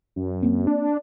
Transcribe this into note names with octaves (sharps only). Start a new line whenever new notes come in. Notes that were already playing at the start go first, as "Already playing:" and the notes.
F#2
A#3 C4
D4